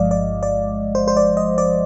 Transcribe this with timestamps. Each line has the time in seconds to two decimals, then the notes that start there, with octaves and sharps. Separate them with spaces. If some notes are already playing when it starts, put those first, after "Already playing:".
Already playing: G1 G2 F3 G#3 D5 D#5 F5
0.11 D5
0.43 D5
0.95 C5
1.08 C5
1.17 D5
1.37 D#5
1.58 D5